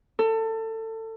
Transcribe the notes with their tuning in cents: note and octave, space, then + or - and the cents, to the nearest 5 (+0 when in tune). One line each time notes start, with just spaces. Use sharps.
A4 +25